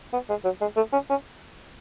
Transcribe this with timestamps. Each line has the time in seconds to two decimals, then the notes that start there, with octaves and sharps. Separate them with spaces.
0.13 B3
0.29 G#3
0.44 F#3
0.61 G#3
0.76 A3
0.93 C#4
1.10 C#4